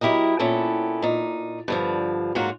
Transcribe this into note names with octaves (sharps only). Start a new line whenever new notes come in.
F#3 E4 G4 A#4 D#5
A#2 B3 C#4 E4 A4 G5
A#2 D#4
G2 D3 F3
G#2 F#3 A#3 F4 F#4